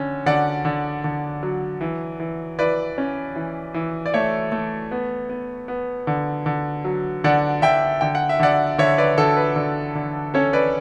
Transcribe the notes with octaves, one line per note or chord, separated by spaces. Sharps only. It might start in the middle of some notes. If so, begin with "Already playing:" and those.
Already playing: D3 C#4
D3 D5 F#5
D3
D3
F#3
E3
E3
E3 B4 D5
C#4
E3
E3
D5
A3 C#5 E5
A3
B3
B3
B3
D3
D3
F#3
D3 D5 F#5
D3 E5 G5
D3 G5
F#5
E5
D3 D5 F#5
D3 C#5 E5
B4 D5
D3 A4
B4
D3
D3
C#4 A4 C#5
B4 D5